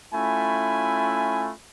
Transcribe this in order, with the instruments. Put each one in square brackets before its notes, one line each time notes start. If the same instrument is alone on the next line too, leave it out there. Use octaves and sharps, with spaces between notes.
[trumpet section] A3 C#4 E4 F4 G#5 B5